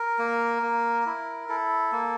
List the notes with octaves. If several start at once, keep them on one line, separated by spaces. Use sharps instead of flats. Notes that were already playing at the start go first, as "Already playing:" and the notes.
Already playing: A#4
A#3
A#3
E4
E4 A4
A#3